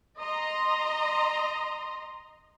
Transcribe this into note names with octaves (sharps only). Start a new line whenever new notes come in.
D#5 A#5 C6